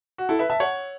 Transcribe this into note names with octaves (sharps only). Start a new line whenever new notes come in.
F#4
E4 A4
B4 E5
E5 A5
C#5 F#5